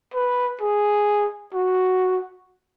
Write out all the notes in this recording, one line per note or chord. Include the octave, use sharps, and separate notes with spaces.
B4
G#4
F#4